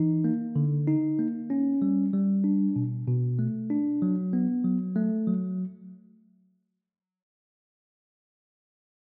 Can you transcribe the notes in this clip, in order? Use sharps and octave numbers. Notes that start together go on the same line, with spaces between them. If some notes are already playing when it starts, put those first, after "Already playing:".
Already playing: E3 D#4
A#3
D3
D#4
A#3
C#4
G3
G3
D4
B2
B2
A3
D4
F#3
B3
F#3
A3
F#3